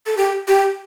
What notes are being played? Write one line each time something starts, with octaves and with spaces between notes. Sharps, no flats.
A4
G4
G4